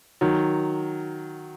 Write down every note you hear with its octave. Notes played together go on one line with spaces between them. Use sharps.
D#3 F#3